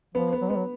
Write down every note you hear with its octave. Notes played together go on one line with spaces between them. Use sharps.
F3 B3
B3
F#3
G#3 B3
F#3